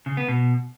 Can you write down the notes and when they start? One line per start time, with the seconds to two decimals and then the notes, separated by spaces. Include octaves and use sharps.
0.06 C#3
0.17 B3
0.28 B2